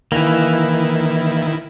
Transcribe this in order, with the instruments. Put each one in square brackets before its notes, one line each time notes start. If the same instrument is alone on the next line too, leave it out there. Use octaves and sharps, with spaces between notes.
[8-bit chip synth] D#3 E4 [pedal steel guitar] E3 A#3